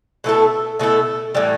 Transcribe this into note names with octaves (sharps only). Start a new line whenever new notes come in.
B2 A3 E4 A4
B2 A3 E4 A4
A2 E3 G3